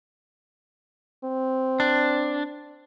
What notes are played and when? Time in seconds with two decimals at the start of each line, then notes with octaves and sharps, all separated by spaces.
1.24 C4
1.80 D4